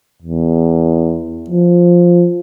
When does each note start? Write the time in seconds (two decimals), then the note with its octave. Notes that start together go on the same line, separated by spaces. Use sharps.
0.22 E2
1.50 F3